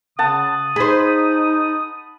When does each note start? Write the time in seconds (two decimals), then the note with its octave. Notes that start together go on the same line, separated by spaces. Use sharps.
0.19 C#3 F#5 A5 D#6
0.76 D#4 G#4 C5 B5